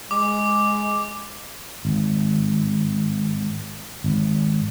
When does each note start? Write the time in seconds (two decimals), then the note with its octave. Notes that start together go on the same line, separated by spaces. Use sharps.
0.11 G#3 D6
1.85 G#1
4.04 G#1